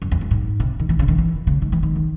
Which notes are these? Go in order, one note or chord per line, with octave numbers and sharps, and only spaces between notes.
F#2
E2
F#2
G#2
C3
D#3
E3
C#3
D#3
E3
C#3
D#3
E3
D#3
C#3